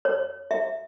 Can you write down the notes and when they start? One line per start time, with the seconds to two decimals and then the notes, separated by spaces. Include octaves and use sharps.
0.05 C#5
0.51 E5